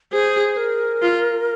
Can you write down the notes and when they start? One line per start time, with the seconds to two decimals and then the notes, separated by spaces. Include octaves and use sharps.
0.12 G#4 C5
0.57 A#4
1.02 F4